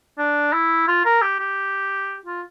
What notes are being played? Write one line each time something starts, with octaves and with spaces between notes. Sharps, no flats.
D4
E4
F4
A#4
G4
G4
F4